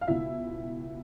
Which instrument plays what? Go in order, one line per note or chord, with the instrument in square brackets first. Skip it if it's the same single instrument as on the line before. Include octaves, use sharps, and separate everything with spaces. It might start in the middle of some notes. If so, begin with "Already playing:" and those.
[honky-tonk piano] F5
C#2 B2 E4 E5